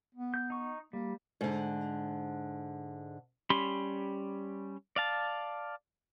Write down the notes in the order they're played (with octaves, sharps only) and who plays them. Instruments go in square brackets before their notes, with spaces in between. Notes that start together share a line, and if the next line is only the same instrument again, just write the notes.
[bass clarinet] B3
[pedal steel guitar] G6
D#4 C#6
[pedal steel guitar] G3 [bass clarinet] A#3
[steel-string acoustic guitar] G#2 D3
[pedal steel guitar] G3 C#4 G4 B5 C6
D5 F5 A5